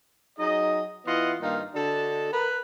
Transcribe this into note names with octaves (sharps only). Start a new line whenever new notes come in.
F#3 D#4 G#4 D#5
E3 B3 E4 F4 D#5 F#5
G2 D#3 A#3 D#4 F4 F5
D3 D4 F#4 A4 D#5 A5
A#4 B4